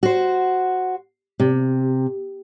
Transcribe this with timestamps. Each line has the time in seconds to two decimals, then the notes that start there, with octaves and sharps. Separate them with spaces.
0.03 F#4 C5
1.40 C3